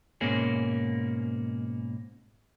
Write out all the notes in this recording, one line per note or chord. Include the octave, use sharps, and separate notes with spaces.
G#2 B2 A#3 C#4 G#4